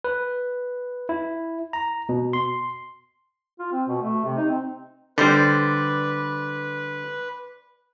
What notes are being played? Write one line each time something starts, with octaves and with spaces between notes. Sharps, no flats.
B4
E4
A#5
B2
C6
F4
C4
B2
A3
C3
D#4
C4
D3 G3 B4 C5 D5